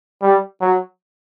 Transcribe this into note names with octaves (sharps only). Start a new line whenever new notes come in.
G3
F#3